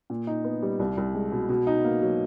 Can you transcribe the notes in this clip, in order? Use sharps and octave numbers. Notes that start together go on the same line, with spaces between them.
A#2
D#4
B3
G3
C2
C2
G#3
B2
B2
D#4
A#3
F#3